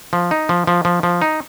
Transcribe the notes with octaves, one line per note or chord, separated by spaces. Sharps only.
F3
D#4
F3
F3
F3
F3
D#4